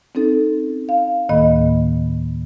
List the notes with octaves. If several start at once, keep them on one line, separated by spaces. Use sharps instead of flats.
C4 C#4 D#4 A4
F5
D2 A2 D#3 A#3 D#5 B5